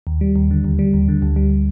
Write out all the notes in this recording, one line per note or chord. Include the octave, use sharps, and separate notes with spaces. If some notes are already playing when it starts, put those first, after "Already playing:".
D#2
G3
D#2
D3
D#2
G3
D#2
D3
D2
G3